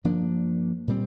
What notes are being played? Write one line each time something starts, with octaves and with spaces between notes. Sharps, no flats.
G2 F3 A#3 D4
A#2 G3 C4